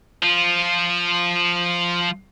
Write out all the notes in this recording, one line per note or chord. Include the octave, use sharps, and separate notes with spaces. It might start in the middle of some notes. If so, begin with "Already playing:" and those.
F3 F4